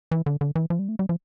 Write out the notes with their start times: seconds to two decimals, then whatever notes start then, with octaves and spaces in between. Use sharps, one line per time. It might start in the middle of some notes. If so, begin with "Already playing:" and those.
0.11 E3
0.26 D3
0.41 D3
0.56 E3
0.70 F3
0.79 G3
0.89 A3
0.99 G3
1.09 F3